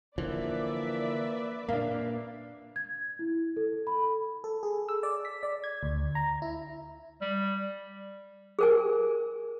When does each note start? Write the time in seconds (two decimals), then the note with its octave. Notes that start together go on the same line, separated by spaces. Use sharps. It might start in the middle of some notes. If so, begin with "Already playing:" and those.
0.18 D3 E3 F3 A#3 B4 D5 E5
1.69 A#2 A#3 D4 F5
2.76 G#6
3.19 E4
3.57 A4
3.87 B5
4.44 A4
4.63 G#4
4.89 E6
5.03 D5
5.25 B6
5.43 D5
5.64 G#6
5.83 D2
6.15 A#5
6.42 E4
7.21 G3
8.59 G#4 A#4 G#5